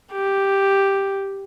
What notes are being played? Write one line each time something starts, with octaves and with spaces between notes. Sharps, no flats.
G4